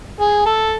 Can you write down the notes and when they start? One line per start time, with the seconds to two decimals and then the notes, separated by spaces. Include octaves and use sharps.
0.21 G#4
0.46 A4